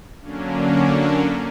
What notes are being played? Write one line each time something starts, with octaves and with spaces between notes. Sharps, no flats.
D3 F#3 A#3 C#4 D4